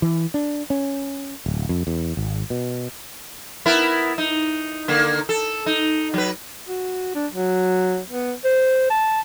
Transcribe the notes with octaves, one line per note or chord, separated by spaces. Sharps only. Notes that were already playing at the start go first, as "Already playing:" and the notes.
E3
D4
C#4
D1
F2
E2
G#1
B2
B3 E4 A#4
D#4
D3 A#3
A4
D#4
F#3 B4
F#4
D4
F#3
B3
C5
A5